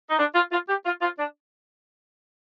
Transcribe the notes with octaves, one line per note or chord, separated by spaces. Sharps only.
D#4
D4
F4
F4
G4
F4
F4
D4